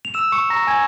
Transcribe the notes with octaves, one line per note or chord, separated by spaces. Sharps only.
F7
E6 E7
C#6 C#7
A#5 A#6
G#5 G#6